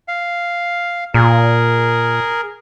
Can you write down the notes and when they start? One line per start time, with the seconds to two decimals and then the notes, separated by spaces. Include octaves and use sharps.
0.08 F5
1.14 A#2 G#4 A#4